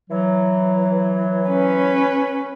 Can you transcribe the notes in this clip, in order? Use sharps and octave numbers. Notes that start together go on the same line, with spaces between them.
E3 F#3
C#4 B4